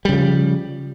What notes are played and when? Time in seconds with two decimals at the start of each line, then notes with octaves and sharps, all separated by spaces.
0.05 G3
0.09 C#3
0.13 F3